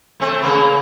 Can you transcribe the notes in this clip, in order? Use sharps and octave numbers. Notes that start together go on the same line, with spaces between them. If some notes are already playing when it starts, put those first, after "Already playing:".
A3 C4
C#3 A#3 B3